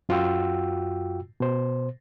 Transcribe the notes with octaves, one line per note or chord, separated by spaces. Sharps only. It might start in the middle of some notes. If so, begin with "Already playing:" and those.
F#2 F4 F#4 G5 E6
B2 C5